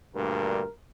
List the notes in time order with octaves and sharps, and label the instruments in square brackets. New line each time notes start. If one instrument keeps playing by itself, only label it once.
[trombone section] D2 G2 A#2 [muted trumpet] A#4